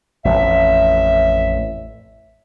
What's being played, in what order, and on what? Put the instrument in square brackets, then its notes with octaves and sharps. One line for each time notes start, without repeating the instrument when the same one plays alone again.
[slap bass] A1 F2 [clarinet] E5